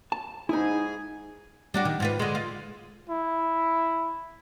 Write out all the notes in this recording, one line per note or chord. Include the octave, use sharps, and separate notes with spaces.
A5
G#2 D#4 E4 G#4 G#5
G3 D4 F#4
D#3
G#2 F4 B4
D3 G#3
F4
E4